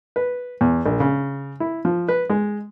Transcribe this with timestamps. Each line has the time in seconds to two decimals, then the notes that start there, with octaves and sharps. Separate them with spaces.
0.16 B4
0.61 E2
0.86 A#1
1.00 C#3
1.60 E4
1.85 F3
2.08 B4
2.30 G#3